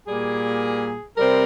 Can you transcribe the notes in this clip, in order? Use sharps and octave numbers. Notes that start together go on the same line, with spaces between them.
A#2 G3 A#3 G#4
C3 G3 C4 A#4